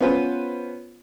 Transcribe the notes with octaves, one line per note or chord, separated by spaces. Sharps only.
B3 C#4 F4 B4 C5